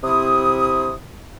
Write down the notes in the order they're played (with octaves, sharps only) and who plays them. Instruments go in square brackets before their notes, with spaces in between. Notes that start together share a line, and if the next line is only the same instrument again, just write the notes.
[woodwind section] C3 E4 D#6